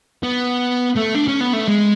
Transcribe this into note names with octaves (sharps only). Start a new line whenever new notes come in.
B3
A3
D4
C#4
B3
A3
G#3